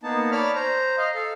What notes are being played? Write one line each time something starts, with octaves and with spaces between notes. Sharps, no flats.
A#3 B3 D#4 A5
C#5 D5 A5 B5 F6
C5 A#5
D#5 F5
A4 F5